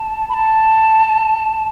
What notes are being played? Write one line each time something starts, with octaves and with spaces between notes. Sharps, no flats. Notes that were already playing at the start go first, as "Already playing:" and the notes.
Already playing: A5
B5
A5